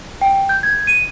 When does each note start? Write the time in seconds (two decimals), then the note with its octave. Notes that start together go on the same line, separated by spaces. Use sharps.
0.21 G5
0.49 G6
0.63 G#6
0.87 D#7